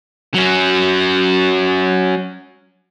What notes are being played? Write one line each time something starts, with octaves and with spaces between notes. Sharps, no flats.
F#3 C#4